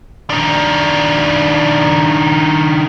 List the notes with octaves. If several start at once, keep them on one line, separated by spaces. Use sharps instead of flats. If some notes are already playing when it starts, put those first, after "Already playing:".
D#3 D4